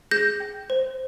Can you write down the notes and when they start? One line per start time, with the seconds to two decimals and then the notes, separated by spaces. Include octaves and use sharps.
0.11 G#4 G6 A#6
0.40 G5
0.70 C5